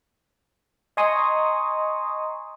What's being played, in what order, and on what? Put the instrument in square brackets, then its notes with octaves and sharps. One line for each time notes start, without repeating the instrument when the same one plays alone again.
[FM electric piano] D#5 G#5 A#5 C6 C#6 D#6